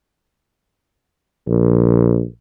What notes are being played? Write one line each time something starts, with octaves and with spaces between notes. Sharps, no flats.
A#1